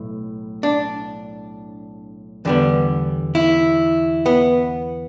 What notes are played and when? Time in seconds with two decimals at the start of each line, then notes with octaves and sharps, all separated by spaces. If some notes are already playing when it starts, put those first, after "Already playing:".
Already playing: B1 A2
0.63 D4
2.45 E2 D3 G3 B3
3.35 E4
4.26 B3